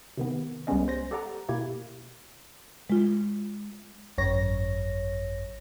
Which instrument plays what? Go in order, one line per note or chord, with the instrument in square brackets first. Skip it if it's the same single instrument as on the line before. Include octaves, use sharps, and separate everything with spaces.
[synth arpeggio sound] C3 D#3 B3
C2 G3 G#3 B3 C#4 D#5
C5 G6 A#6
G4 A4 D5 F#5 A#5 D6
B2 A#3 E4 G4 G#6
[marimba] G#3 F4
[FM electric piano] G#1 F#2 C#5 A#6